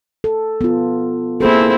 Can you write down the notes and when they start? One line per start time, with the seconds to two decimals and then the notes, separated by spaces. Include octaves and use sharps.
0.24 A4
0.61 B3 F4
1.41 A#3 C4 E4 G#4 A4